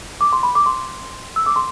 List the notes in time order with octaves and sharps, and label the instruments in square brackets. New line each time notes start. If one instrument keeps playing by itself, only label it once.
[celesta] D6
C6
B5
D6
C6
E6
D6
C6